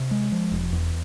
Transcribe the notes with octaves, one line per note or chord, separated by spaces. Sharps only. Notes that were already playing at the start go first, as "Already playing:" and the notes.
Already playing: C3
G#3
F3
E1
E2